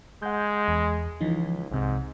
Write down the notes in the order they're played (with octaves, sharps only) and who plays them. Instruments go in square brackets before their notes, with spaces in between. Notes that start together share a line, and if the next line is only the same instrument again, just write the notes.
[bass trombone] G#3 [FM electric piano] F#5 G6
[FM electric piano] E2
[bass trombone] C#2 [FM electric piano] E3 F3 D#4
[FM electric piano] C2 C3 [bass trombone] G#2